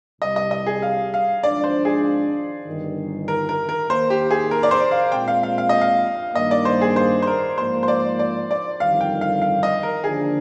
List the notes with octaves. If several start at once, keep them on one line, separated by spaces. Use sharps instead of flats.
C2 C3 G3 D#5
D#5
D#5
G#4
F5
F5
G#1 G#2 F3 G#3 D4 D5
C5
G#4
G1 G2 D#3
A#4
A#4
A#4
D#2 D#3 A#3 C5
G4
G#4
A#4
D5
C5
F5
A#2 G#3 C4 G5
F5
F5
F5
D#5
F5
G2 D#3 A#3 D#5
D5
C5
G#4
C5
C5
A#4
G#2 F3 A#3 C5
C5
D5
D5
D5
G1 F2 D#3 G3 F5
G5
F5
F5
D#5
A#4
D#2 D3 F3 A#3 D4 G#4